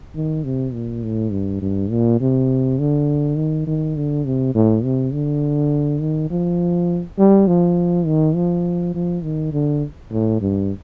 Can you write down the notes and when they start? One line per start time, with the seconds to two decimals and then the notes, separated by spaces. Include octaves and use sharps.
0.15 D#3
0.44 C3
0.73 A#2
1.04 A2
1.32 G2
1.62 G2
1.91 A#2
2.21 C3
2.79 D3
3.37 D#3
3.67 D#3
3.96 D3
4.25 C3
4.55 A2
4.84 C3
5.13 D3
6.01 D#3
6.30 F3
7.18 G3
7.47 F3
8.06 D#3
8.35 F3
8.94 F3
9.24 D#3
9.53 D3
10.11 A2
10.41 G2